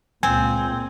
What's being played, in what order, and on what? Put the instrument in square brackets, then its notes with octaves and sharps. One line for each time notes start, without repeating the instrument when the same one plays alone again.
[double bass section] C#2 A#2 [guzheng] C4 [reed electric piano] G#5